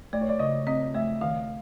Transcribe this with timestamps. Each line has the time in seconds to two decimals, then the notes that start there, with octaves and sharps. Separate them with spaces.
0.13 A3 D5
0.21 C#5
0.29 D5
0.39 C#3 D#5
0.67 C4 D#5
0.95 A3 E5
1.21 D#3 F5